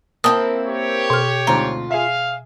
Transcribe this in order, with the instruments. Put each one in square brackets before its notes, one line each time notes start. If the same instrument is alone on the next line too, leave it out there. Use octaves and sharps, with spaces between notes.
[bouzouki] A#3 C4 E4 [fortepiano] G5 A5 [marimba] D#6
[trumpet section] G4 C#5
[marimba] B2 F6
[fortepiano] D2 G#2 C4 [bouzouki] F4 [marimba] A#5
[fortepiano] G#4 E5 [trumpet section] F5